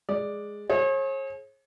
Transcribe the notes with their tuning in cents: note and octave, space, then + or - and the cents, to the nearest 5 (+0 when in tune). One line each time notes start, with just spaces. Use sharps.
G#3 +0 D5 +0
G#4 +30 C#5 -45